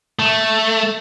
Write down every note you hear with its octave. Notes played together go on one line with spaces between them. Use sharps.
A3